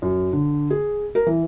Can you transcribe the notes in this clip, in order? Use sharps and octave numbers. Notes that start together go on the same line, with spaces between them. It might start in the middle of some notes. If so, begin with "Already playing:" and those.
F#2
D3
G#4
A#4
E3